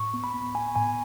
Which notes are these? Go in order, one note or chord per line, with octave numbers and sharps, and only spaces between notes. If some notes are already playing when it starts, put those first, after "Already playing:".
Already playing: A2 C#6
B3
B5
B3
B3 G#5
A2 G#5